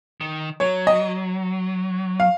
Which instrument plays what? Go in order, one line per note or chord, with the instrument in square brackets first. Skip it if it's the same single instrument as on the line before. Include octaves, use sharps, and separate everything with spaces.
[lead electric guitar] D#3
[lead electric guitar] F#3 [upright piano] C#5
[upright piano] D#5
F5